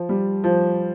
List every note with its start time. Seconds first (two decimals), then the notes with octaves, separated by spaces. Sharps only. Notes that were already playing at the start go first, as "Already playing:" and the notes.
Already playing: F3
0.09 G3
0.44 F3